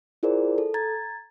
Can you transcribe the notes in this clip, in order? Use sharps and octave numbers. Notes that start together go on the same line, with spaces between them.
E4 F4 G#4 A#4 C5 D5
A4
A#5 G#6 A6